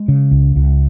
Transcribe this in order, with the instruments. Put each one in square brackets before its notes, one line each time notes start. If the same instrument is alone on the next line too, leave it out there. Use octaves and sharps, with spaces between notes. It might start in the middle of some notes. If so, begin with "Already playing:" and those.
Already playing: [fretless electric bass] G#3
C#3
C#2
C#2